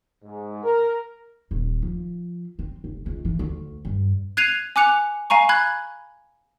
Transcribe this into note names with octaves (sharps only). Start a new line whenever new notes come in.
G#2
A#4
D#1
F3
C4
F1
C#2
E3
D2
G2
F#6 G#6 C7 D#7 F7
G#5 D6 F#6 C#7 F7
F5 G#5 A#5 C#6
B5 F#6 G#6